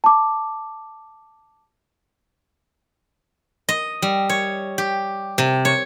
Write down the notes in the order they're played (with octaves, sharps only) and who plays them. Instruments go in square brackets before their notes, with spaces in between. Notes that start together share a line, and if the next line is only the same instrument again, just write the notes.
[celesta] A5 D6
[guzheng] D#5
G3
C#5
G4
C3
C#5